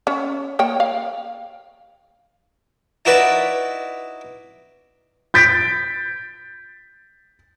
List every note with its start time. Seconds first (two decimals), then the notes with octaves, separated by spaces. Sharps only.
0.07 C#4 C#5
0.59 A#3 C#5 G5
0.80 F5
3.05 D#4 E4 F#4 B4 D5
5.34 G6 A6 B6 D7